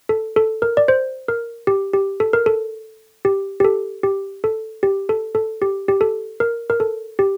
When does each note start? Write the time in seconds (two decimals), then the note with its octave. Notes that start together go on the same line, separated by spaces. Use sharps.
0.09 A4
0.36 A4
0.62 A#4
0.77 D5
0.88 C5
1.28 A#4
1.67 G4
1.93 G4
2.20 A4
2.33 A#4
2.46 A4
3.25 G4
3.60 G4
3.65 A4
4.03 G4
4.44 A4
4.83 G4
5.09 A4
5.35 A4
5.62 G4
5.88 G4
6.01 A4
6.40 A#4
6.70 A#4
6.80 A4
7.19 G4